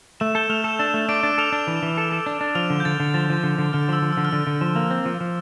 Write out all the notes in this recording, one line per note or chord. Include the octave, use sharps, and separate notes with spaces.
A3 E6 E7
A4 G6 G7
E7
A3 F6 F7
A4 E6 E7
D4 E6 E7
A3
D4 D6 D7
D4
A4 F6 F7
D4
E3
E3
A4
A4
D4
D4
F3 F6 F7
D3
G6
D3 A6
D3
F3 A6
F3
D3
D3
D3 F6
F3 E6
F3
D3 E6
F6
D3 E6
D3
F3
A#3
C4
F3
F3